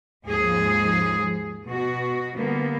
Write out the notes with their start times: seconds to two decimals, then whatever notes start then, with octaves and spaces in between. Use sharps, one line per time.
0.25 D#2 G#2 F3 G#4
1.66 B2 F#4
2.37 D3 G3 A#3 B3